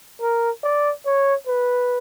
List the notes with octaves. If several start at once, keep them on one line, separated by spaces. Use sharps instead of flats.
A#4
D5
C#5
B4